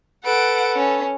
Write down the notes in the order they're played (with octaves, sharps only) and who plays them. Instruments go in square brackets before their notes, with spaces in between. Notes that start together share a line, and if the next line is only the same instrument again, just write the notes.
[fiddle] A4 B4 [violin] F#5 D7
[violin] C#4